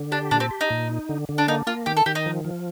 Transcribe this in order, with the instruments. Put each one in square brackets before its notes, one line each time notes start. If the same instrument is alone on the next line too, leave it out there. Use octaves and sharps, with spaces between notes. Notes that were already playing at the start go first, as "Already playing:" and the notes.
Already playing: [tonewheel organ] D3
[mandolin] D4 [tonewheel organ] G4
[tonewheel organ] A#2 [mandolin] D4
[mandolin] C4
[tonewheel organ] G4
[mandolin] D#4
[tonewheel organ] A#2
D#4
D3
D3
[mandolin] D4
[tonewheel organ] A#3 [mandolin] D#4
[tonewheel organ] A#3 [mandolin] F4
[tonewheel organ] D#3 [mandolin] G4
[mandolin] A4
[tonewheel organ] D#3 [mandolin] G4
[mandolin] D#4
[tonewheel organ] F3
F3